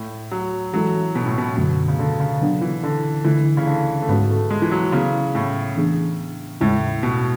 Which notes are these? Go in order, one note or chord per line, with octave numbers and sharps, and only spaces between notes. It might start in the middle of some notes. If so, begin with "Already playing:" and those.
Already playing: A2
F#3
E3 F#3 G#3 C#4 E4 A4
B2
A2
B2
F#2 B2 D3 F#3 A3
C#3
D3
C#3
C#3 F#3 B3 D4
E3
D3
D3 E3 A3 E4
C#3
D3
A3
G#2 G#3 B3 C#4 F#4
A3
G#3
E3
F#3
C#3 F#3 B3 E4 G#4
A2
E3 B3 D4 G#4
E2 A2 C#3 G#3 C#4 E4
B2